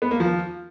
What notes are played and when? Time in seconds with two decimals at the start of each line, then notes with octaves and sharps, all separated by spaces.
0.02 B3
0.11 A#3
0.20 F3